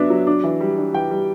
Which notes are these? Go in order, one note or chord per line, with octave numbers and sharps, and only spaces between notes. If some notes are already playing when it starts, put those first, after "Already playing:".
Already playing: F#3 B3 D4 E5
F#3
D4
E3
G3
D4
E3 G5
G3